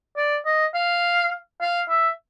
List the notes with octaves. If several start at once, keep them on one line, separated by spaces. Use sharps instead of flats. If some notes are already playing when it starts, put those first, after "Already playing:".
D5
D#5
F5
F5
E5